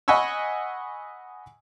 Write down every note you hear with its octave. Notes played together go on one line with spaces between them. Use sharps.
D#5 F#5 G#5 B5 C#6 E6